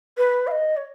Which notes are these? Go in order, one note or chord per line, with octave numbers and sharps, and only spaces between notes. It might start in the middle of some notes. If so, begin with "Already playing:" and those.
B4
F5
D#5
C#5